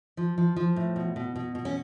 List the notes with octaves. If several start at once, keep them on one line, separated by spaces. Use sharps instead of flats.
F3
F3
F3
A2
B2
B2
B2
B2
C#4